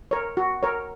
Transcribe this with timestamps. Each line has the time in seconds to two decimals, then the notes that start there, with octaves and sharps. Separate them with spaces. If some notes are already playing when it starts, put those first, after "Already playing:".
0.11 A#4 C#5
0.37 F#4
0.63 A#4 C#5